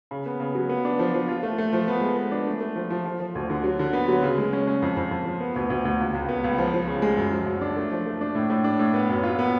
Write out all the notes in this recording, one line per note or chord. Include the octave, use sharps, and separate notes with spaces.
C#3
B3
C#3
F#3
B3
D4
F3
F3
F4
A3
A3
F3
B3
G#3
B3
D4
A3
A3
F3
F3
F3
F3
D2
D3
F#3
D3
B3
F#3
C#3
G#3
C#4
C#4
F2
F2
F2
F3
B3
D2
D2
D2
C#2
C#2
B3
C#2
F3
F3
C#3
G#3
F#2
F3
F#2
D4
A3
F3
A3
D4
A2
A2
D4
A2
B3
F#2
F4
B3